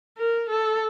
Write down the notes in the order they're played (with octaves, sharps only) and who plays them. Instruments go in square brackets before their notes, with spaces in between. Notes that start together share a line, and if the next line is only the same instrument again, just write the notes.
[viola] A#4
A4